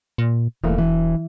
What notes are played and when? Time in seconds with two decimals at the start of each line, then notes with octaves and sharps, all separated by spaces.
0.18 A#2
0.64 E1 E3 A3 A#3
0.78 E3